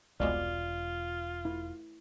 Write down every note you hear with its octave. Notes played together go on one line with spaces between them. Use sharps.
E1 C2 B2 G#3 F4 D5
E4